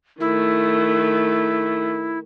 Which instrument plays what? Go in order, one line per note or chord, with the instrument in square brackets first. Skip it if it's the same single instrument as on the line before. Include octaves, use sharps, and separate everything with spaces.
[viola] D#3 A3 [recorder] E4